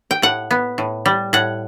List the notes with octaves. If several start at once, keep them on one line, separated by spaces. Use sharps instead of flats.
G5
A2 F#5
B3
A2
G3
A2 F#5